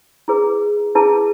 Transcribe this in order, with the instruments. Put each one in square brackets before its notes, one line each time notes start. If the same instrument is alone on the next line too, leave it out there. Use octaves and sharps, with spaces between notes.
[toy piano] E4 G#4 B4
E4 G#4 B4 A5